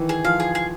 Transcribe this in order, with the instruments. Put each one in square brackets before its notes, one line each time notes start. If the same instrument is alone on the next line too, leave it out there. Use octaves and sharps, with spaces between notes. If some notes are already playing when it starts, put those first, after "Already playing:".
Already playing: [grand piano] D#3 E3
[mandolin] G#4
[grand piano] F3 [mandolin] F5
[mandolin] G#4
G#4